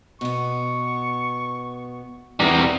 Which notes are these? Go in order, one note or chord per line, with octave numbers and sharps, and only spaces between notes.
B2 B3 C#6
E2 C3 E3 G3 A#5